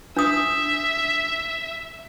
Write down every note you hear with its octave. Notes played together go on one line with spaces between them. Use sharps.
D4 E5 D#6